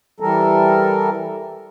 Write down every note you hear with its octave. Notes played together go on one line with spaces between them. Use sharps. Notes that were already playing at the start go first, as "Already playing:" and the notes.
E3 G3 A4 A#4